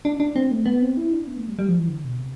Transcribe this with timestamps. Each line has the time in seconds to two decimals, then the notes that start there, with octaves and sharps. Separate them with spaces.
0.05 D4
0.20 D4
0.36 C4
0.51 A3
0.66 B3
0.82 C4
0.97 E4
1.13 D4
1.27 B3
1.37 A3
1.47 G3
1.59 G3
1.68 F3
1.78 E3
1.89 D3
2.05 B2
2.20 C3